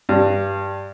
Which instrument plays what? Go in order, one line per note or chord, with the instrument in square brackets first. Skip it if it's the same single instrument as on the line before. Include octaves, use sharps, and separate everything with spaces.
[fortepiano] G2